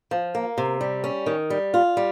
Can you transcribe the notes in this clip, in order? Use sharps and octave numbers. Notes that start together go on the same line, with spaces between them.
F3
A#3
C3
G3
C#4
D#3
G3
F4
G3